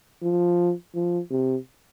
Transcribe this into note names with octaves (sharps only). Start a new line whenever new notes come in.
F3
F3
C3